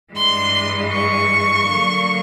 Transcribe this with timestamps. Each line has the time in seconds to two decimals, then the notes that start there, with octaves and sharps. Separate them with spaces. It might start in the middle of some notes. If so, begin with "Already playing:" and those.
0.13 G2 E3 G#3 C6
0.90 C#6
1.68 D3 F#3 A#3